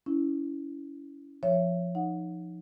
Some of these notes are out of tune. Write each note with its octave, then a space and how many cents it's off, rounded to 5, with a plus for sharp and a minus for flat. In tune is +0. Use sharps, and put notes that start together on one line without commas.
C#4 +25 E4 +0
F3 +0 C#5 +0 E5 +25
D#4 +0 F#5 -15